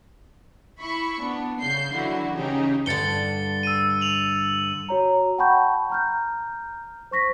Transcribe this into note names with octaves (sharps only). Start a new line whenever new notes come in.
E4 B5 C#6
B3 D4
C#3 G6 C7
D3 E3 F#3 E4 F#4
C#3 E3 D#4 G4 G#4
G2 D3 A6 C#7 G7
E6 D#7
F7 F#7
F#4 C#5 A#5
F#5 G5 A5 B5 C#6 G6
A#5 F6 G6
C5 C#6 A#6 B6